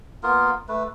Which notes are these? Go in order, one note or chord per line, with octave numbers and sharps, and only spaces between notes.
A#3 B3 F4 A#4
A3 B4